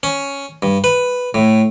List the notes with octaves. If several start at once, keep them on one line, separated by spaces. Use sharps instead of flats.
C#4
G2
B4
A2